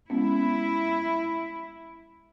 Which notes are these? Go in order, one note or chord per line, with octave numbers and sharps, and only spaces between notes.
G#3 B3 C#4 E4